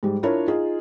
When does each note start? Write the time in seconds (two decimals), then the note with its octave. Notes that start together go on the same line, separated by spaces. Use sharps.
0.03 G#2 G3
0.23 D4 E4 F4 A#4 C#5
0.48 D#4 F4 G#4